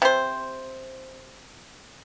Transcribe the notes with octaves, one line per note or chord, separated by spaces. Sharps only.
C3 C5